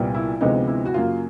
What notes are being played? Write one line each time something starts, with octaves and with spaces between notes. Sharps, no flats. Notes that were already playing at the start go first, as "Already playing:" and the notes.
Already playing: C2 A#2 G3 B3
E4
D2 C3 F3 G#3 B3 D#4
E4
F#4
F#2 C#3 F#3 A#3 F4